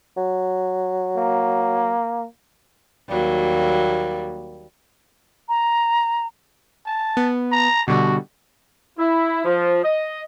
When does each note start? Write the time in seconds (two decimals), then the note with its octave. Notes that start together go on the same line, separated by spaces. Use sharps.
0.17 F#3
1.17 A#3
3.09 D#2 F#3 G3 A#3
5.49 A#5
6.86 A5
7.17 B3
7.52 A#5
7.88 B2 D3 G3 F#4
8.98 E4
9.45 F3
9.84 D#5